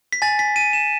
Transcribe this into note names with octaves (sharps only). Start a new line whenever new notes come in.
B6
G#5 A6
B6
G#5 D#7
E7